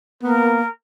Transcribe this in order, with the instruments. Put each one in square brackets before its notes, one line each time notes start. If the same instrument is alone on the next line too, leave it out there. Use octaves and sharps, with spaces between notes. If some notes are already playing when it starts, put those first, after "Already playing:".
[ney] A#3 [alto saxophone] B3 [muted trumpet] A#4